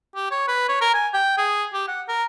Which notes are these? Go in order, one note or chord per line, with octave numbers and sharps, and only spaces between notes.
G4
C#5
B4
C#5
A#4
G#5
G5
G#4
G4
F#5
A#4